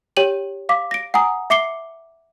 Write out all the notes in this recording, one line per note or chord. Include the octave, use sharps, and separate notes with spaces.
G4 C#5 G5 D#7 F#7
F5 D6 B6
A#6 D7
F#5 G#5 A#5 D#6
E5 D6 C7 C#7 G7